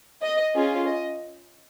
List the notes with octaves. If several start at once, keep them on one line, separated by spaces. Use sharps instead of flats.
D#5
C#4 F4 G#4
D#5